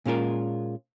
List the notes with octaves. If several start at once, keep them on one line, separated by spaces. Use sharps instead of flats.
A#2 G#3 C#4 F4 A#4